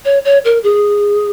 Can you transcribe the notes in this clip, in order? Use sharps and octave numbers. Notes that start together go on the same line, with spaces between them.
C#5
C#5
A#4
G#4